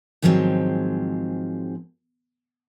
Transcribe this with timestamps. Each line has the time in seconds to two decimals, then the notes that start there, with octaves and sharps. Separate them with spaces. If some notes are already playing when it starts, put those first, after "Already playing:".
0.22 G#2 D#3 F3 F#3 G#3 C4